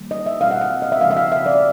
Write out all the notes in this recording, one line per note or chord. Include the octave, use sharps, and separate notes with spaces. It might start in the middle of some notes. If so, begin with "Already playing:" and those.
Already playing: D#3 G3 A#3
D#5
E5
B2 G3 C4 F5
F#5
F5
D#5
E5
C#3 F3 G#3 C4 F5
E5
F5
E5
D5